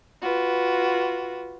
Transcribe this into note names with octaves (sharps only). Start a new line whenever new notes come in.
F4 F#4 B4